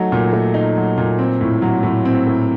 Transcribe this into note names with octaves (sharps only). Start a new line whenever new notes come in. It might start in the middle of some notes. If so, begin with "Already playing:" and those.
Already playing: F#3 A3 D#4
A#2
A3
D#4
F#3
A#2
C4
A2
F#3
A2
C4
A2